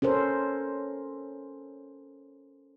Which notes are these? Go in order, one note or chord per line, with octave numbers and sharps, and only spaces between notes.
C#4 A4 A#4 C5